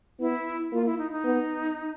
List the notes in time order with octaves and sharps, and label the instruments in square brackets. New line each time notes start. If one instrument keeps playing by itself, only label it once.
[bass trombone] B3 [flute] E4
[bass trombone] A#3 [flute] F4
[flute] E4
D#4
D#4
[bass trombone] B3